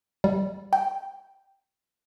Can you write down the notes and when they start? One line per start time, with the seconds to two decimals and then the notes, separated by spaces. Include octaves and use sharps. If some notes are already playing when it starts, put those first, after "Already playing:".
0.24 G3
0.73 G5